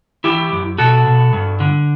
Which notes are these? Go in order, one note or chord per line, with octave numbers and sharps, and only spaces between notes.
E3 E4 G4
F#2
B2 F#4 A4
B2
G2
D3